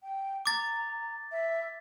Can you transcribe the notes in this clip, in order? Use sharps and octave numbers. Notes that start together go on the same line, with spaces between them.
G5
A#5 D6 A6
E5